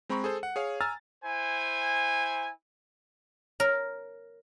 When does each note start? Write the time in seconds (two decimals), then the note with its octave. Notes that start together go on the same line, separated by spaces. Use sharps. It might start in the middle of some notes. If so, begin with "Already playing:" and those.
0.09 G#3 C4 A#5 B5 C#6
0.24 G#4 A4 C5
0.43 F#5
0.56 G#4 C#5 F5
0.81 G#5 A#5 E6 F6 A6
1.24 E4 C5 G#5
3.60 A#4 C#5